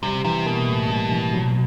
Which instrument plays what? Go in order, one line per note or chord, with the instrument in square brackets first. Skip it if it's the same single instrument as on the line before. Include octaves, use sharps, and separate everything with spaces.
[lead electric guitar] C3 [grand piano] G3
[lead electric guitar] C3 [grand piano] E3
[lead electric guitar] B2 [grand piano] A#3
[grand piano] A2
G3
E3
F#3